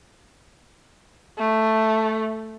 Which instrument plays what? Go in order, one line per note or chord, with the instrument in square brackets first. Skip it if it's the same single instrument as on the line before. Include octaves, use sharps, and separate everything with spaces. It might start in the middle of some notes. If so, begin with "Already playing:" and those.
[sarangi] A3